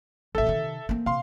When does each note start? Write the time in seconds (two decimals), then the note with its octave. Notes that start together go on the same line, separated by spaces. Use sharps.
0.35 F1 A#1 A4 E5
0.47 C3 D#3
0.89 A#3 C4
1.06 C3 F5 C6